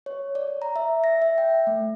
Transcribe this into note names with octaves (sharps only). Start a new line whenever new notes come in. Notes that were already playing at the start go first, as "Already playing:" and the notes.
C#5
D5
A#5
E5
A#6
E5
G5
A3